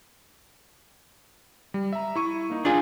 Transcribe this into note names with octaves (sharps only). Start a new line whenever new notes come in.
G3
E5 A#5
E4 C#6 D#7
A#3 D#4
D4 F4 G#4